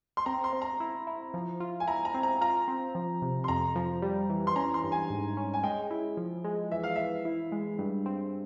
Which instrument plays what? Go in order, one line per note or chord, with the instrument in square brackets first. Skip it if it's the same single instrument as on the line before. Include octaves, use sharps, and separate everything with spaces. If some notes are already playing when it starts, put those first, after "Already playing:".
[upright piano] C6
[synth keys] C4 [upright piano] A#5
[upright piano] C6
[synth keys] C4
[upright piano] A#5
[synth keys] E4
E4
F3
F4
[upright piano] G#5
[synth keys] E4 [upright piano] A#5
[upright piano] A#5
[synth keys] C4
[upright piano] A#5
[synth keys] F4 [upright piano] A#5
[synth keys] C4
F3
C3
[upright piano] C6
[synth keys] F2 [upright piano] A#5
[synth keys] F3
G3
E3
[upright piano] C6
[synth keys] C#4 [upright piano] A#5
[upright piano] C6
[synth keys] G2
[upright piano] G#5
[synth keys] G#2
C#4
[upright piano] G#5
[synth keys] G#3 [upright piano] G5
[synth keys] E4
F3
G#3
[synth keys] E3 [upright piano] E5
[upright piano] F5
[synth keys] E3 [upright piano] E5
[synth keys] E4
G#3
G2
C4